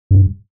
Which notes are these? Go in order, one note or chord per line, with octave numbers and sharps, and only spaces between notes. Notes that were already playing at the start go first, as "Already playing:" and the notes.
G2